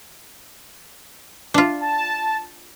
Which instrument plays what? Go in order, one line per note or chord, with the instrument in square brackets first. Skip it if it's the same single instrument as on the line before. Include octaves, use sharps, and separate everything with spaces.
[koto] D4 F4
[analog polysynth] A5